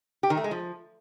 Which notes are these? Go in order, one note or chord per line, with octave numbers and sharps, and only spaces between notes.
G4
D#3
A3
G#3
F3